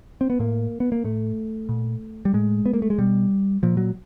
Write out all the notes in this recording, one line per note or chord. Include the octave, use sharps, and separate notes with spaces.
C4
B3
A2 A#3
B3
A#3
A2 A3
A#2
G3
A2 G#3
B3
A#3
A3
G#3
B2 G3
A#2 F3
F#3